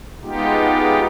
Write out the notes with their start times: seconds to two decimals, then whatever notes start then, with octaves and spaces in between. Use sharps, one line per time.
0.23 G#3 B3 D#4 F4 G4